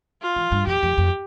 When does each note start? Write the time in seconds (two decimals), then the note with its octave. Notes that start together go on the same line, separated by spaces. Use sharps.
0.22 F4
0.36 E3
0.52 G2
0.67 F2 G4
0.83 F2
0.98 F2